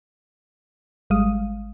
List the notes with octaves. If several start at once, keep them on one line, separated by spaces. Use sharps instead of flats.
G#1 G3 G#3 F5 D#6